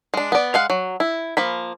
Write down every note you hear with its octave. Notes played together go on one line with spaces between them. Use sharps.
G#3 D4
B3 D5
G#3 F5 F#5
F#3
E4
F3 A#3 B5